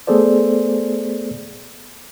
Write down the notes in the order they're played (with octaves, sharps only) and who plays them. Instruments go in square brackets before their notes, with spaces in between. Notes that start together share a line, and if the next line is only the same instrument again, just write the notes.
[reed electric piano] A3 B3 G#4 A4 C5 D5